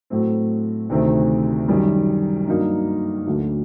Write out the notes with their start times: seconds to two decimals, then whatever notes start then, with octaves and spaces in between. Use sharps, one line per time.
0.10 A2 F#3 A3 C4
0.89 D2 C3 D#3 A3 C4
1.68 F#2 D#3 G3
2.48 G2 F#3 A#3 D#4
3.26 D2 D3 F#3 A3